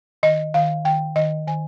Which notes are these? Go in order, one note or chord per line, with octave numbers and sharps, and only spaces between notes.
D#3 D#5
D#3 F5
D#3 G5
D#3 D#5
D#3 G#5